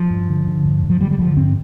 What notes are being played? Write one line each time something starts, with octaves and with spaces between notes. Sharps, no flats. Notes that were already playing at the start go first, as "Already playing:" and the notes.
Already playing: F3
G2
D3
D3
G2
G2
F3
D3 G3
G3
D3 F3
G2 C4